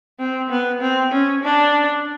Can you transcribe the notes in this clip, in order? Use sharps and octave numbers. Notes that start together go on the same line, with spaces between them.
C4
B3
C4
C#4
D4